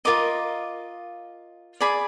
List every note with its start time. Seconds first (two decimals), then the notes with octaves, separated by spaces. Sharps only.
0.05 F4 A#4 D#5 D6
1.80 G#4 D5 B5